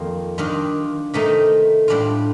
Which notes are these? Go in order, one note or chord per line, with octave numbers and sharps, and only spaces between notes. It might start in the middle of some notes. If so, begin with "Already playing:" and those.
Already playing: F2 D#3 A#3 F4
D#3 G3 D4 F4
C3 D#3 A3 D#4
A2 G3 D4 F4